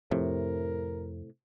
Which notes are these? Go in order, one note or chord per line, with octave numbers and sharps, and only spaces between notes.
F2 A2 C3 A#4